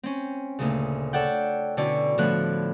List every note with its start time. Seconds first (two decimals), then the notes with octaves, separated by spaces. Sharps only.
0.03 C4 C#4
0.59 D2 A#2 C#3
1.13 A4 C#5 D5 F#5 G5
1.77 B2 D3 C#4 E4 D5 C#6
2.18 A2 D3 F3 B3 C#5 F#6